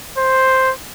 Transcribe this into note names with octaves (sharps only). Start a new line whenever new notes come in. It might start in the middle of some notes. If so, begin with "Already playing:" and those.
C5